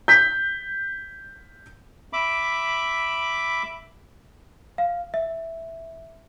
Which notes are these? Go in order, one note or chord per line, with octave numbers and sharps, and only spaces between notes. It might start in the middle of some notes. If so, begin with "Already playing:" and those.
G6 B6
E5 B5 D6
F5
E5